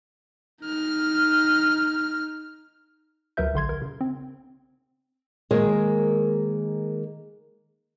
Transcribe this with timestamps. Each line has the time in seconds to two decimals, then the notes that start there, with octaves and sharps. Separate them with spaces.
0.63 D#4 F6
3.37 D2 F#3 A#4 B4 E5 G6
3.54 A#1 D3 C6 G#6
3.69 A#4
3.82 C#3
4.01 C4
5.51 D#3 G#3 A#3 G#4 A#4 C5